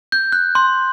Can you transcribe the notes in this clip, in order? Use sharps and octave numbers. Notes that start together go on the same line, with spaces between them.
G6
F#6
C6